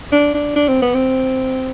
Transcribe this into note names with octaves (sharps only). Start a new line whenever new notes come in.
D4
D4
D4
C4
B3
C4